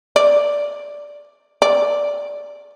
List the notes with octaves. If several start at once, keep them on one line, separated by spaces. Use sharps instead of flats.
D5
D5